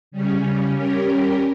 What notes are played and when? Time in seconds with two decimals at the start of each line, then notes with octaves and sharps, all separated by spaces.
0.11 C#3 G3 C#4
0.75 G3 C#4 G4 A#4